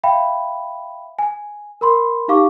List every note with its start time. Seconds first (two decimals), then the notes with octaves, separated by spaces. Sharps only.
0.04 E5 F5 G5 B5
1.19 G#5
1.81 A#4 B5 C6
2.28 D#4 G4 F5 C#6 D6